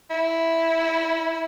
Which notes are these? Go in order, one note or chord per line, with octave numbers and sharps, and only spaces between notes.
E4